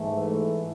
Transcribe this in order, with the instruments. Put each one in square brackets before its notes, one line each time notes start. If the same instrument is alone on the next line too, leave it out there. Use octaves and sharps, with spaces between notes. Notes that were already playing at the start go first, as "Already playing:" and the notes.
Already playing: [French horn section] G#2 E3 A3